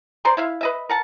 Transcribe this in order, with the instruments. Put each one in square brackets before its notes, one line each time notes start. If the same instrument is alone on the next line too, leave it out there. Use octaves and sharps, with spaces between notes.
[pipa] C5 D5 A#5 C6
E4 E5 F5
B4 D#5 E5
A#4 F#5 A5